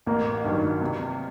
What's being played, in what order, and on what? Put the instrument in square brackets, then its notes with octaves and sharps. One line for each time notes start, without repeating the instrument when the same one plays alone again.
[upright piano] A1 [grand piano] A#3
[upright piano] G2 D#3 F#3
C3